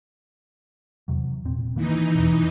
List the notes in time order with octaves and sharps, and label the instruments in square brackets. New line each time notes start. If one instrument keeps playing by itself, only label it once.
[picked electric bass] E2 C3 F#3
E1 A#2 C4
[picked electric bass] D#3 A#3 C4 [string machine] E3 D#4
[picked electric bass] E2 B2